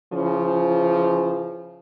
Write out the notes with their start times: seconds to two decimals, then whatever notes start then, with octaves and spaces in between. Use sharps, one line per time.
0.12 C#3 E3 F3